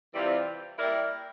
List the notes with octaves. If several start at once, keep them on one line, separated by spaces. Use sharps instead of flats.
C3 E3 G3 C4 F4
G3 A#3 E4 A#4 D5